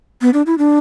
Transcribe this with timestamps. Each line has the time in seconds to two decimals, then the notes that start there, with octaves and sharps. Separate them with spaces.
0.21 B3
0.34 D4
0.46 E4
0.58 D4